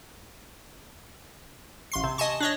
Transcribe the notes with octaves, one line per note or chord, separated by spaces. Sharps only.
A1 C6 C7
C3
D#5 G#5 A5 C#6
D4 C#5 D#5